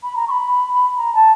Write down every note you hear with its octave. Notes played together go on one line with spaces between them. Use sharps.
B5
A#5
C#6
B5
A#5
A5